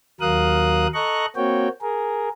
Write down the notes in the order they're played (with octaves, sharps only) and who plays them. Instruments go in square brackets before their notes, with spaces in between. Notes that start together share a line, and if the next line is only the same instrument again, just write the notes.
[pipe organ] D#2 F#3 A#4 F5 D#6 F#6
A4 D#5 A#5 C#6 F#6
A#3 C4 F#4 C#5 G5
G#4 A#4